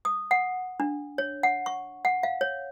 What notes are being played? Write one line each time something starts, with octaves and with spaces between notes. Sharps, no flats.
D#6
F#5
D4
C#5
F#5
C#6
F#5
F5
C#5